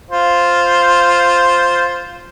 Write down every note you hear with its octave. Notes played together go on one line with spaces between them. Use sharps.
F4 C5